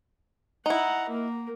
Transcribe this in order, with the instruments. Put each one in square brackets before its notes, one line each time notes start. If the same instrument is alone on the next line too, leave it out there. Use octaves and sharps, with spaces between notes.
[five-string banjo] D#4 E4 [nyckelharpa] F#5 A#5
[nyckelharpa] A#3 A#4